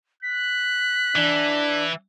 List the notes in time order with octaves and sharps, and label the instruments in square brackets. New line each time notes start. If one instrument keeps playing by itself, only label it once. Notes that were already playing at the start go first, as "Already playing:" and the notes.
[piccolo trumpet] F#6 [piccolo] B6
[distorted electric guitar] E3 [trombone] D4